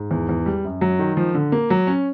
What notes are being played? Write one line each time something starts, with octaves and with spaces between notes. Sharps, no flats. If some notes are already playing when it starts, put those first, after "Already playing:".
Already playing: G#2
E2
E2
G3
F#2
F#3
D#3
F3
D3
A#3
F#3
C#4